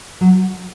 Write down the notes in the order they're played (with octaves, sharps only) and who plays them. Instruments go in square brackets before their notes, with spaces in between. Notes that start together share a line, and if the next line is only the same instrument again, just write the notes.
[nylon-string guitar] F#3